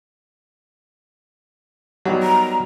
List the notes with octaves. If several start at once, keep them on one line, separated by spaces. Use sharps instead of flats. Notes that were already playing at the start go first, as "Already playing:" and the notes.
F#3 G3 B3 D#4
A#5